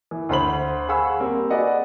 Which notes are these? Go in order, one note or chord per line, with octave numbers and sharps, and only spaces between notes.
E3
D2 C5 B5 F#7
G#4 F5 F#5 B5 C#6 E6
G3 A#3 C4
F#4 G#4 B4 D5 D#5 F#5